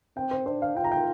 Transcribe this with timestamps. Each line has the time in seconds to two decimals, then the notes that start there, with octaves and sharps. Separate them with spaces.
0.17 C4 G5
0.31 C5
0.46 D4 C5
0.62 F5
0.76 F4 G5
0.84 A#5
0.92 G5